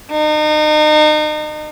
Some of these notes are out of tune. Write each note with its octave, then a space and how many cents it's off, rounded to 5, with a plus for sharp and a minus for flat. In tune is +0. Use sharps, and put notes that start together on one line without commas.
D#4 -35